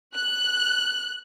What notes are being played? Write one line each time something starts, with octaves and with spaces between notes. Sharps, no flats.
F#6